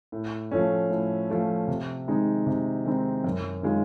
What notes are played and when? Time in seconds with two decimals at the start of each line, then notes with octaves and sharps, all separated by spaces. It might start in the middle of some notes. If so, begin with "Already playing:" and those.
0.12 A2
0.51 F3 A3 C#4
0.90 A2
1.29 F3 A3 C#4
1.68 C3
2.08 D#3 G#3 C4 D#4
2.47 C3
2.86 D#3 G#3 C4 D#4
3.24 F#2
3.63 D#3 G#3 C#4 F4